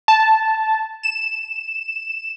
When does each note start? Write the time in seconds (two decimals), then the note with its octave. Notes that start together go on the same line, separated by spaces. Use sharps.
0.08 A5
1.03 E7